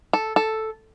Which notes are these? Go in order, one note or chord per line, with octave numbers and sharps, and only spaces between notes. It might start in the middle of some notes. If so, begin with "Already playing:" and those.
A4
A4